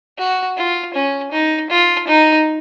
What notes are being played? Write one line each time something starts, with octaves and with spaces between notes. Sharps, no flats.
F#4
F4
C#4
D#4
F4
D#4